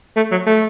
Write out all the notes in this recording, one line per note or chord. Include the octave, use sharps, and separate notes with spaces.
A3
F#3
A3